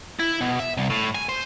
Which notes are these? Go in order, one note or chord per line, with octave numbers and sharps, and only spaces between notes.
E4
B2
E5
C2
A2
G#5
C5